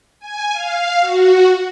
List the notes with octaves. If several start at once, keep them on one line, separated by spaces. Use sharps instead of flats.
G#5
F5
F#4